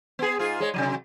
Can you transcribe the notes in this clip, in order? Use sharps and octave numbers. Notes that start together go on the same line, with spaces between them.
B3 G#4
G#2 F4 G#4
G#3 C#5
C3 D#3 F#3